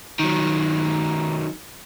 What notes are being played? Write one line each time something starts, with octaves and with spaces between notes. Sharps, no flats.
D#3 F#3